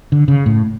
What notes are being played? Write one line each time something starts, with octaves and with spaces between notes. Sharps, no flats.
D3
C#3
A2